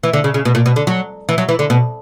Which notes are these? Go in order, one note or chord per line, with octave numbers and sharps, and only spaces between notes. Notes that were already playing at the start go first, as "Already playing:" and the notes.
E3
D3
C#3
C#3
B2
A#2
B2
D3
F#3
E3
F#3
E3
D3
B2